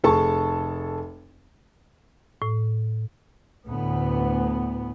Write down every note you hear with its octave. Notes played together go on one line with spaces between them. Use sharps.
F1 G#4 A4 A5 C#6
A2
D2 A2 B3